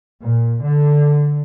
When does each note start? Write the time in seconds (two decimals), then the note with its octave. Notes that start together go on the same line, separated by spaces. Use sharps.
0.21 A#2
0.62 D3